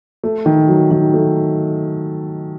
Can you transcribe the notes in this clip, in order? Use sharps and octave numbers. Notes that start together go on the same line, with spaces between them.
A3
D#3
F#3
D#3
A3